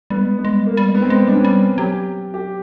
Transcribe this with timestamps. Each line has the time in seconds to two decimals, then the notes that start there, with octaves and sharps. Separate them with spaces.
0.10 G3 B3
0.22 G#3
0.33 G3
0.39 B3
0.45 G#3
0.55 G3
0.66 G#3 A#3
0.77 G3
0.89 G#3
0.95 B3
0.99 G3 C4
1.10 G#3 B3
1.22 G3
1.27 D4
1.33 G#3 C#4
1.45 G3
1.78 F#3 G4
2.34 G4